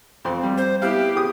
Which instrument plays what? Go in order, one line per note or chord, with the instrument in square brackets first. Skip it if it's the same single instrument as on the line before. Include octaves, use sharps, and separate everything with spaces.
[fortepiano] F2 C4 C6
G3
[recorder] C5
[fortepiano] B3 E4 F5 [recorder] G4
[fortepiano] G4 G#4 D#6